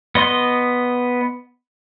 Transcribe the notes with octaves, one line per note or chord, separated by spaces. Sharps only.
B3 D#5 C6